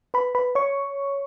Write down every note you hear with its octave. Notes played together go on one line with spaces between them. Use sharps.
B4 B5
B4 B5
C#5 C#6